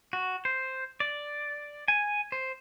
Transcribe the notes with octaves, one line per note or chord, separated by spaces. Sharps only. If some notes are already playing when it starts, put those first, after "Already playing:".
F#4
C5
D5
G#5
C5